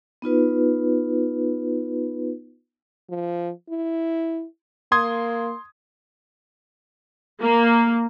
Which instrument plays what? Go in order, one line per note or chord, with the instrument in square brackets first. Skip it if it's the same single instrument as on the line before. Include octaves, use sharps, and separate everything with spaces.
[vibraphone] B3 D#4 F4 B4
[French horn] F3
E4
[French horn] A#3 [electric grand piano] C6 D#6 G#6
[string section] A#3